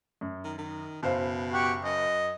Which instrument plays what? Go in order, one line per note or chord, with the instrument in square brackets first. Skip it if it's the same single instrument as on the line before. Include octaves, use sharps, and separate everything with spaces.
[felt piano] F#2
[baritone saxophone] D#3
D#3
[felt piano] F#1 C5 F5 [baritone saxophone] B2
[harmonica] G4 F#5 C#6
[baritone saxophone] F#2 [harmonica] D#5